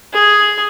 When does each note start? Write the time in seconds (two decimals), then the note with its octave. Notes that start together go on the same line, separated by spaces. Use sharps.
0.13 G#4